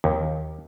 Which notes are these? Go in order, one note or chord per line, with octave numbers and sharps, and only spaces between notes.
D#2